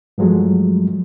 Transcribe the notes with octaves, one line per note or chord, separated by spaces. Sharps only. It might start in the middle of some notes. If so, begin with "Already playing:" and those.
G2 F3 F#3 G#3 A3